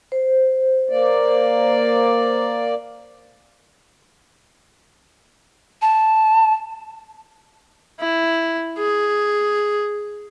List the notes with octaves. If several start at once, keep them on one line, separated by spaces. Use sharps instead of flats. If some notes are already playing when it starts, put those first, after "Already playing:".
C5
A#3 D5
A5
E4
G#4